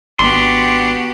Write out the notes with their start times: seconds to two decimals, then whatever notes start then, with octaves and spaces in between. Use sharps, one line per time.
0.19 G#1 B3 D4 F#4 G4 C6